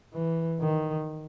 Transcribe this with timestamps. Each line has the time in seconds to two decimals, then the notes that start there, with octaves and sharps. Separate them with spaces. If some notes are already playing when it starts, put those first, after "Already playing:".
0.14 E3
0.61 D#3